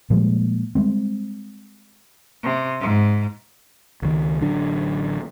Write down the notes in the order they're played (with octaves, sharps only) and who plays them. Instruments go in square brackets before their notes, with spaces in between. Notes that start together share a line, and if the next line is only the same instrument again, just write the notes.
[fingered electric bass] A#2 F3 G3 G#3
G3 G#3 C4
[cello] C3
G#2
[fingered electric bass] C#2 D#3
A1 D3 F#3 D4